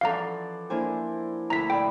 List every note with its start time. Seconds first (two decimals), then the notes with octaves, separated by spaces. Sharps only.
0.01 E3 F3 C#4 A4 D5 F5 F#5 A#5
0.70 A#3 D4 E4 A#4 C5 G#5
1.50 D2 E4 A4 A#5 B6
1.70 A2 D5 E5 G5 B5